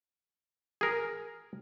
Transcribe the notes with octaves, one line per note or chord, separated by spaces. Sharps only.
G#4 A#4